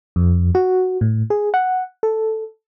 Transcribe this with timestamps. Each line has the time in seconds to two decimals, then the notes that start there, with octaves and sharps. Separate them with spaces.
0.16 F2
0.55 F#4
1.01 A2
1.30 G#4
1.54 F#5
2.03 A4